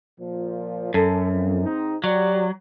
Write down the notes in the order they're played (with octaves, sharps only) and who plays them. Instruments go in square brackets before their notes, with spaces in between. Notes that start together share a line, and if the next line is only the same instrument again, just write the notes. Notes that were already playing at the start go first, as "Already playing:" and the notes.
[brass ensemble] A#2 F3
[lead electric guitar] F#2 [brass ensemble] A4
[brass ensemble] F2
G#2 C4 D#4
[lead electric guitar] F#3 [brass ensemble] F#4 G4 D5